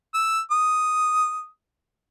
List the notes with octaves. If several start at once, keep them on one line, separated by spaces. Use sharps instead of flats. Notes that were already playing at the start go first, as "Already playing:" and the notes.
E6
D#6